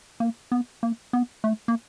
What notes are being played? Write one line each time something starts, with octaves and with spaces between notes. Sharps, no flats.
A#3
B3
A#3
B3
A3
A#3